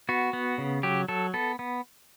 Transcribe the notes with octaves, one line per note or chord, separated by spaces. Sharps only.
B3 F#4
B3
C#3
F#3 G4
F#3 A4
B3 A4
B3